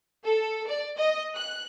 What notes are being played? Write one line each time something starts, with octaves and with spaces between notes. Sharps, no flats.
A4
D5
D#5
F#6